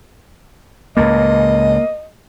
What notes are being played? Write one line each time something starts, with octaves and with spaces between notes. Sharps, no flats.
C#2 A2 A#3 D#5